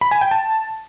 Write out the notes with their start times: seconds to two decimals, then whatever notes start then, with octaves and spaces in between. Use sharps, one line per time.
0.01 B5
0.11 G#5
0.21 G5
0.31 A5